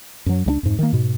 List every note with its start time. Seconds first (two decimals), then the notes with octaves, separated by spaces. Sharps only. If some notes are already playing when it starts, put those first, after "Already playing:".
0.26 F#2 F#3
0.46 C#2 G3 D4
0.63 F2 G#2
0.79 D#3 A#3
0.92 G#2 B2